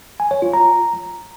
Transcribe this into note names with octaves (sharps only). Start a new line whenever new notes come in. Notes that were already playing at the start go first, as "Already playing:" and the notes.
G#5
C#5
F4
A#5